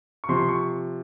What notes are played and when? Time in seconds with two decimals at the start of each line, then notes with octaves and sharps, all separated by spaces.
0.24 C#6
0.29 C3 F3 C6
0.39 C6
0.49 C#6